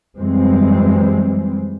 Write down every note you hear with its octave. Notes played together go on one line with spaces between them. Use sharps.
F#2 E3 G3 G#3 C4